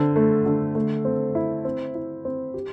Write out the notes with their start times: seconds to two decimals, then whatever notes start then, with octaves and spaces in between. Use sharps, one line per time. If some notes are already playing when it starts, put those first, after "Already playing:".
Already playing: D3 C4
0.16 A3
0.46 D3
0.75 A3
1.05 C4
1.35 E4
1.65 C4
1.95 E4
2.25 C4
2.54 G4